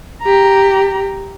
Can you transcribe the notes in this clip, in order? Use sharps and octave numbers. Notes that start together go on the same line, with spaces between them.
G4 A#5